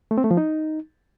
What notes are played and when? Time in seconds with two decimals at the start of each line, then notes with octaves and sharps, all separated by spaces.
0.11 A3
0.18 C4
0.24 A3
0.31 F3
0.37 D#4